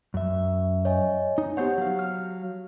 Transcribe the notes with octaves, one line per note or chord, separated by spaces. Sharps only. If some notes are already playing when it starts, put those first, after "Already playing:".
F#2 E5
C#5 D#5 G#5
D#4
B3 G4 C5 C#5 F#5
F#3 F5
F6